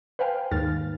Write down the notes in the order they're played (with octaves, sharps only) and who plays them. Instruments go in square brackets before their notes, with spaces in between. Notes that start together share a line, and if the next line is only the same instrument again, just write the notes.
[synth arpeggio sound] B4 C5 F5 G5 G#5
D#2 G#2 F6 A6